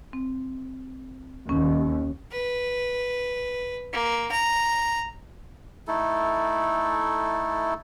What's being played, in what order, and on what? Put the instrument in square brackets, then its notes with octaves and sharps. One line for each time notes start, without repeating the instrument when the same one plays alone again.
[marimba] C4
[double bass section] D#2 [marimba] C#4
[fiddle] B4
A#3
A#5
[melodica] A3 D#4 E4 A4